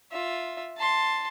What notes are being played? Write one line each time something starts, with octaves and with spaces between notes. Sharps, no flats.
F4 E5
A5 C6